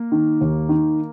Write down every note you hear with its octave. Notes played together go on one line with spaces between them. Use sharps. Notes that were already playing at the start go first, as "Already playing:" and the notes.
Already playing: A#3
D#3
D#2
D#3